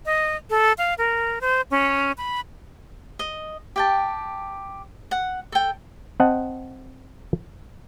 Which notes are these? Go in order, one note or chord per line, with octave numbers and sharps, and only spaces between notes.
D#5
A4
F5
A#4
C5
C#4
B5
D#5
G4 G5 A5
F#5
A4 G5
C4 D#5 F#5 A5